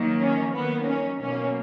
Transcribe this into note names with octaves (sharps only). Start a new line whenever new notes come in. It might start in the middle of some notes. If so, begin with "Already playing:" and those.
Already playing: D#3 F#3 A#3
C#4
D#3 F#3 A#3 B3
C#4
B2 F#3 A#3 C#4